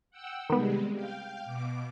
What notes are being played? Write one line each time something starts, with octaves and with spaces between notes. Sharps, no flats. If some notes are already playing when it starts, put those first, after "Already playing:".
F#5 G5 E6
C3 D#3 G3 G#3 B3
F5 G5
B2 D6